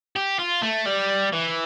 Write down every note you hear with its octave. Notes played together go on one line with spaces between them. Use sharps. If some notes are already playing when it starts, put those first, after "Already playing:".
G4
F4
A3
G3
E3